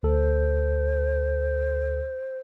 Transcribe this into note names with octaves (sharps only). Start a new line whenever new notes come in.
D2 A4 C5